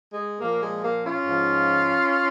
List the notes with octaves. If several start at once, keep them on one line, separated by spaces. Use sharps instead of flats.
G#3
A#2 F3 A#3
G#3
A#3
C#4 F4
G#2 F3